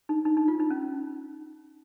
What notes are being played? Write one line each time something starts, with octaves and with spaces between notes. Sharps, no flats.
D#4
D#4
D#4
F4
D#4
C#4